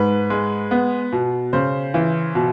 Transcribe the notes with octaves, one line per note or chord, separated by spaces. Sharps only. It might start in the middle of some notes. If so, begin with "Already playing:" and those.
Already playing: G#2 B4
G#3
B3
B2
C#3 C5
E3
B2